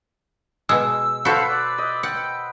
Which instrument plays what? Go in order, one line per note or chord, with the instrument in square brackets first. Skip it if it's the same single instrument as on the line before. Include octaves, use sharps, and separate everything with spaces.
[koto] B2 G#3 [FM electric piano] E6
[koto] F#4 A4 [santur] B4 C5 F#5 [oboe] F5
[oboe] D5
[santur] D#5
[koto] F#5 [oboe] G5